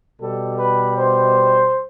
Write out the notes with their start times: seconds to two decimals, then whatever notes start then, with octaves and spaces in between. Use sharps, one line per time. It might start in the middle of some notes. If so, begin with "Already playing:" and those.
0.20 B2 G3 A4
0.59 B4
0.97 C5